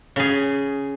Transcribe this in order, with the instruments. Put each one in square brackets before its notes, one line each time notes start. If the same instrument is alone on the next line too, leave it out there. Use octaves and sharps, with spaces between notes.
[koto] C#3 G#4